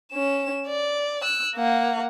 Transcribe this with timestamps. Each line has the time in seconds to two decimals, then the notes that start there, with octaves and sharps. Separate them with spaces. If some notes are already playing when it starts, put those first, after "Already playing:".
0.12 C#4 E7
0.67 D5
1.22 E6 F#6
1.56 A#3 F#5